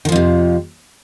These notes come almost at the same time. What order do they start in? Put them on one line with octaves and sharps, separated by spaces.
D#3 F3 F2 C3